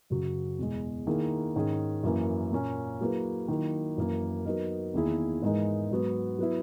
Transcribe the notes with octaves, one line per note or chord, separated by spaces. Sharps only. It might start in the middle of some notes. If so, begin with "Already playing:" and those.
F#2 C#3 F#3
E2 B2 G#3
D#3 A#3 E4 G#4
G#2 D#3 G#3 C#4 G#4
F#2 E3 A#3
A#2 A#3 C#4
F#3 A#3 E4 G#4 B4
D#3 F#3 A#3 E4
F#2 E3 A#3
F#3 B3 D#4 A#4
E2 D#3 A#3 E4 G#4
G#2 E3 G#3 D#4 A#4
G#2 F#3 B3
F#3 B3 E4